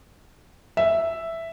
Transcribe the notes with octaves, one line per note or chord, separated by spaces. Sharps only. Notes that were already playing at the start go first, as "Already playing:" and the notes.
E5